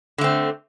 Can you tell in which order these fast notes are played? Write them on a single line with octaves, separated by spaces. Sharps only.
D3 A3 C4